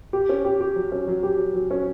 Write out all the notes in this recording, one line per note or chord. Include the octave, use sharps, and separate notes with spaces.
G4
C#4
G4
G4
F#3
C#4
F#3
G4
F#3
F#3
C#4